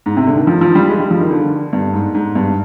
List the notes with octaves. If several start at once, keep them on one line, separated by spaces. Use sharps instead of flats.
G#2
C3
D3
D#3
F3
F3
G3
G#3
G3
F3
D#3
D3
G2
G#2
G#2
G2